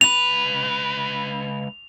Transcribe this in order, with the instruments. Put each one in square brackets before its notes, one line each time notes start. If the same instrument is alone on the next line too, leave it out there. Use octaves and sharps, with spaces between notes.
[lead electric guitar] C#2 B4 [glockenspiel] F7